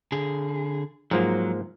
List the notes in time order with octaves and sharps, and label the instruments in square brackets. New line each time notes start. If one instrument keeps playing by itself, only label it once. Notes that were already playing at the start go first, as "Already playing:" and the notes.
[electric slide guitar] D3 G#4
[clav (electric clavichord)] G#2 F3 A#3 [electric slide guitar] F#3